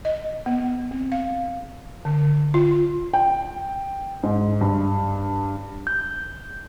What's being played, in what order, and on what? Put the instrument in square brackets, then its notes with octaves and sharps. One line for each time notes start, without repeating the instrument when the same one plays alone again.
[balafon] D#5
B3
C4
F5
D3
F4
[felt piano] G5
G#2
G2
[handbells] G6